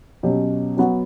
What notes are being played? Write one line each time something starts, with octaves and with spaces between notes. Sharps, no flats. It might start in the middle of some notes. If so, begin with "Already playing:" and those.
B2 F#3 C#4 G4
F#3 B3 F#4